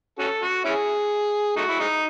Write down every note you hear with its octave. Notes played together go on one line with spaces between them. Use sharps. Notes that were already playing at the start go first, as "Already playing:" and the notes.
C#4 F#4 A4
F#4
C#4 E4 G#4
A3 D#4 F#4
E4
G#3 D#4